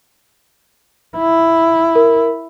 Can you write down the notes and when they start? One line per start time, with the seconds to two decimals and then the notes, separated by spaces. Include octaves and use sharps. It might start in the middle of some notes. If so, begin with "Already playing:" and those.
1.17 E4
1.95 A#4